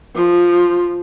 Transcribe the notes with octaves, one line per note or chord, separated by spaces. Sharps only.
F3